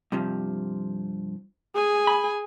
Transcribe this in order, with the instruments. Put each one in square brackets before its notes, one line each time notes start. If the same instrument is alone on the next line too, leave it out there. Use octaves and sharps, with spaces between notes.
[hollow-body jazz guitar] G2 C3 F3
[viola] G#4 G#5
[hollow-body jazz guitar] B5